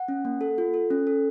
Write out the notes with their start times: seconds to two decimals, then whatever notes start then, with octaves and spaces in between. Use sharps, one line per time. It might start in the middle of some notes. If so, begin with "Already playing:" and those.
Already playing: F#5
0.08 C#4
0.25 A#3
0.41 A4
0.58 F4
0.74 A4
0.91 C#4
1.07 A4